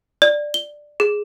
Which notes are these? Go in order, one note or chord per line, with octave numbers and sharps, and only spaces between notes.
D5
G7
G#4